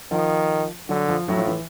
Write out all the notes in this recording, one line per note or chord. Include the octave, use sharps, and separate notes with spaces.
D#3 F3
D3 F#3
F3
A2 F#3
F3
E3